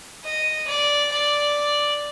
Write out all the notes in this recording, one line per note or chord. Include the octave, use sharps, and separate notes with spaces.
D#5
D5
D5